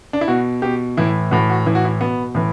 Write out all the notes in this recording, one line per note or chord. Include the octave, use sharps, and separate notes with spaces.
D4
E4
B2 F#4
B2 G4
A2 E3 E4
A2 E3 F#4
F#4
A2 E3 E4
F#4
E4
B2 B3
A2 E3